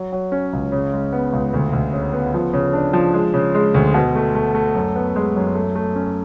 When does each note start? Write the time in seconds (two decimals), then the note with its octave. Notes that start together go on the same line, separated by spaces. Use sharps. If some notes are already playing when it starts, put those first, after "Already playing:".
Already playing: F#3
0.12 F#3
0.32 C#4
0.53 C#2
0.72 C#3
0.93 G#3
1.13 B3
1.33 C#2
1.54 D2
1.73 D2
1.93 C#3
2.13 B3
2.34 F3
2.53 C#3
2.73 D4
2.93 F3
3.14 G#3
3.34 C#3
3.55 G#3
3.74 D2
3.94 B2
4.15 A3
4.35 A3
4.55 A3
4.75 F#2
4.96 B3
5.16 G#3
5.36 F#2
5.55 A3
5.75 A3
5.96 C#4